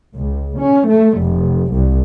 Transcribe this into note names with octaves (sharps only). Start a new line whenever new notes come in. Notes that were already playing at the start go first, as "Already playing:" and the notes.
C#2
C#4
A3
F1
C2